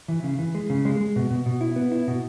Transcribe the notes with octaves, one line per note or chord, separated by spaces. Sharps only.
E3
C#3
E3
G#3
C#3
G#3
G#3
B2
B2
B2
E4
B3
E4
B2